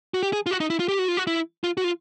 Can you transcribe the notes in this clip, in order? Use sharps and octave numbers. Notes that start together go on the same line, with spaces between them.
F#4
G4
G#4
F4
F#4
D#4
E4
F4
G4
F#4
F4
F#4
E4
F4
F#4
F4